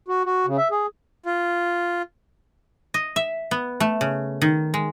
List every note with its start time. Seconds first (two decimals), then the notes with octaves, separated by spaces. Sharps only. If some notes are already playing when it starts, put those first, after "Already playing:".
0.08 F#4
0.25 F#4
0.46 C#3
0.58 E5
0.71 G#4
1.26 F4
2.94 D#5
3.16 E5
3.51 B3
3.80 A3
4.01 C#3
4.41 D#3
4.74 G#3